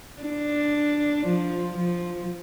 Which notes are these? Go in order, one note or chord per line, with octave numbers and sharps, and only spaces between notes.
D4
F3
F3